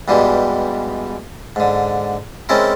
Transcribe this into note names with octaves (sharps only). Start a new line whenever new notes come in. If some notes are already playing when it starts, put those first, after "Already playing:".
G2 B2 E3 G3 G#3
G#2 D3
G#3 C4 C#4 E4 A4 A#4